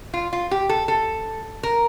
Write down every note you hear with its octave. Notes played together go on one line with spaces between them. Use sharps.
F4
F4
G4
A4
A4
A#4